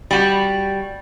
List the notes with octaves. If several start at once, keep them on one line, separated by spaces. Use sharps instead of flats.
G3 F#4